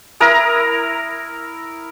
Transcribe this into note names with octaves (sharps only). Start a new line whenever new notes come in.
E4 A#4 A#5 D#6